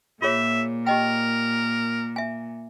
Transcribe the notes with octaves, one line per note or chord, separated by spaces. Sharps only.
A#2 F4 G#4 C#5 E5
G4 A#4 D#5 G5
E5 G#5